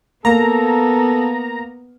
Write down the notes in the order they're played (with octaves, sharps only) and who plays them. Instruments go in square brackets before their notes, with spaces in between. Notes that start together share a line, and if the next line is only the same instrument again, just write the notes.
[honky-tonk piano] A#3 [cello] B3 [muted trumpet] A4 [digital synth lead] A#5